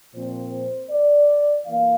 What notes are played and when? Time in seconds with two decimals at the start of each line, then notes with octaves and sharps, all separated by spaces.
0.14 A#2 F3 C4 C5
0.90 D5
1.67 E3 A#3 F5